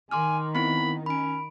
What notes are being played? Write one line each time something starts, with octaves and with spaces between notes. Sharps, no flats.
D#3 G#5 C6 D6 F6
B3 C4 E4 B5
C#4 B5 D7